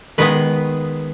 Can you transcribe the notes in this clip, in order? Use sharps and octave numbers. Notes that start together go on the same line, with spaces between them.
D#3 G#3 B3 B4